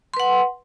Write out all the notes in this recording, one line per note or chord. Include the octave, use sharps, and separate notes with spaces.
B4 F#5 C6